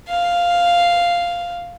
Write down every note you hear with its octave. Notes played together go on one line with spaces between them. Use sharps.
F5